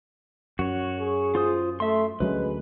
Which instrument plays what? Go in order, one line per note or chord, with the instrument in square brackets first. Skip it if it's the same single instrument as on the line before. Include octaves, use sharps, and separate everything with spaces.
[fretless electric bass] F#2 [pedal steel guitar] F#4 C#5
[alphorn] G#4
[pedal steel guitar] F4 C5 D#6
[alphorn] A3 [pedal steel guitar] E5 C6
[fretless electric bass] D2 F#3 C#4 [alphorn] G#3 [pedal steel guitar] B4